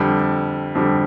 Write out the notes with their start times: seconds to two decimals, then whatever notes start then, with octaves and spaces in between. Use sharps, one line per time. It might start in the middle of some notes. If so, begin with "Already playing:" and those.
Already playing: F2 D3 G3
0.75 F2 D3 G3